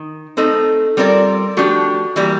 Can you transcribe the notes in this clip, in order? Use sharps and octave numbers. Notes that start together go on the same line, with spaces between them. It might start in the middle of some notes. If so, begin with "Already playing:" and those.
Already playing: D#3
A3 C4 D#4 A4
G3 C4 F4 A#4 D5
F3 A3 D4 F#4 G4
E3 G3 A#3